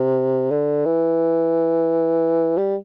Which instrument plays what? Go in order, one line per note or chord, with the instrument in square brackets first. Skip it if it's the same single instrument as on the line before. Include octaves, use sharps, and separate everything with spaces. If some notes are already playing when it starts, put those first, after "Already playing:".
Already playing: [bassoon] C3
D3
E3
G3